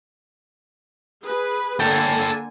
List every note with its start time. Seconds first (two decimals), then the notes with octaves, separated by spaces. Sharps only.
1.22 G#4 B4
1.80 D3 A#3 A4 G5 G#5